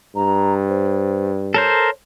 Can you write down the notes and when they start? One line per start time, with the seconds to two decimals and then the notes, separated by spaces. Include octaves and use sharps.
0.15 G2 A#5
0.68 C5
1.54 A4 A#4 C5 C#5